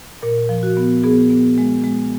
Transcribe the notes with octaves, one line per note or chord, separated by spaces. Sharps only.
A#2 A#4
F3
F#4
B3
B3 G#4
B3
G#3
G#3